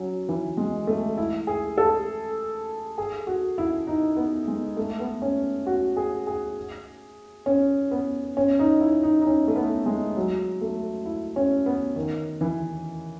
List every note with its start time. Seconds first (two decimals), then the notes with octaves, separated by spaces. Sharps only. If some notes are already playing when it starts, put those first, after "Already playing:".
Already playing: F#3 C#4
0.29 E3
0.57 G#3
0.87 A3
1.18 E4
1.47 G#4
1.78 A4
2.98 G#4
3.27 F#4
3.58 E4
3.87 D#4
4.17 B3
4.48 G#3
4.77 A3
5.00 B3
5.22 C#4
5.66 F#4
5.97 G#4
6.27 G#4
7.46 C#4
7.91 B3
8.37 C#4
8.59 D#4
8.81 E4
9.03 D#4
9.22 D#4
9.27 C#4
9.48 A3
9.56 B3
9.86 G#3
10.16 F#3
10.61 A3
11.05 E4
11.36 C#4
11.66 B3
11.96 D#3
12.41 E3